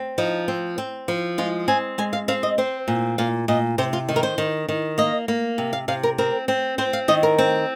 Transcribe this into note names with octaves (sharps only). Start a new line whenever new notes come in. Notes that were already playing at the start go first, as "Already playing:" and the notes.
Already playing: C4
F3 D#4
C4
C4
F3
G#3 F4
C4 G#5
G#3 G#5
F5
C4 F5
D#5
C4 C5
A#2
A#2 F5
A#2 D#5
C3 C5
F4
D#3
A#4
C5
D#3
D#3
A#3 D#5
A#3
C3
F5
C3 F5
A#4
C4 A#4
C4
C4 C5
F5
D#3 D#5
A#4
C4